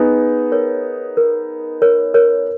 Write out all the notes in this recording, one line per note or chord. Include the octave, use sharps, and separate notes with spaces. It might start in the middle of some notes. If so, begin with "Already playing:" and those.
Already playing: B3 D#4 G#4
A#4 C#5
A#4
A#4 C#5
A#4 C#5